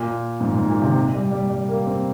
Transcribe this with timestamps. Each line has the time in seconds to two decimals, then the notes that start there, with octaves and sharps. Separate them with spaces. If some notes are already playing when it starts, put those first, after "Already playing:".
Already playing: A#2
0.41 G#2
0.54 G#2
0.69 A#2
0.82 C3
1.14 G3
1.31 G3
1.50 G3
1.68 A#3
1.86 C4